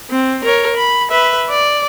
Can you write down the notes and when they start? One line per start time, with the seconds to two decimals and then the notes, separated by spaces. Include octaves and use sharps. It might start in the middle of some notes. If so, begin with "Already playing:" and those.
0.11 C4
0.45 A#4 C#5
0.77 B5
1.11 B4 E5
1.50 D5